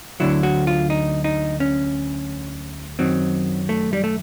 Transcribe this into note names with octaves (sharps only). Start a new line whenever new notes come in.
D2 D3 F#3 E4
F#4
F4
D#4
D#4
C#4
F#2 D#3 F#3 C4
A3
G3
A3